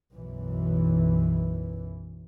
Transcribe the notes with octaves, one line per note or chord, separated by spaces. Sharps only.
B1 F#2 E3